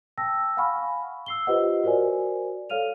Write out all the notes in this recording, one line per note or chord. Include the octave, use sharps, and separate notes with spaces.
G5 A5 E6 A#6
F5 F#5 G#5 B5 C#6 F6
E6 C7 G7
F4 G4 B4 C5 D#5 F#5
F#4 A#4 C5 D5 G#5
A4 C#5 F5 F6 D#7 F7